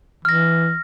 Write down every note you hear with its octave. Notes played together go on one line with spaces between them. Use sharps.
E3 F6 A#6